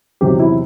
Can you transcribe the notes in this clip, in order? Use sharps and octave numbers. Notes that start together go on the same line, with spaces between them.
E2 C3 D#3 F#3 G4
E4